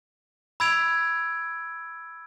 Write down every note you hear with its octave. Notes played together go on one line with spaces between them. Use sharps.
B5 E6 G#6 D7 F7